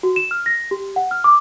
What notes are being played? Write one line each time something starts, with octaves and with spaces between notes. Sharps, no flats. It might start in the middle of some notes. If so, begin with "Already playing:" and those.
F#4
E7
F6
A#6
G4
F#5
F6
D6